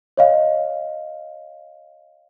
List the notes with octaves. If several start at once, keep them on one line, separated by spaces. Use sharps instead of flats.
C#5 D#5 F5